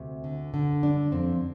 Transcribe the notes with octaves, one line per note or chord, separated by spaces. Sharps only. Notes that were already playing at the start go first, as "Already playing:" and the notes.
Already playing: D2 C3
D3
D3
G3 D4
F2 C4